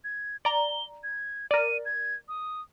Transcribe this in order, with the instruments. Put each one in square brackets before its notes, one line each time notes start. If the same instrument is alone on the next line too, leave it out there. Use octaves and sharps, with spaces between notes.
[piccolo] G#6
[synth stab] D5 A#5 [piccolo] G7
[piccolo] G#6
[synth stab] A#4 D5 [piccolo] D#7
[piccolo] G#6
D#6